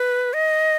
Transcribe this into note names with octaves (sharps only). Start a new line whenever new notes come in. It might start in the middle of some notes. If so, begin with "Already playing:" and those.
Already playing: B4
D#5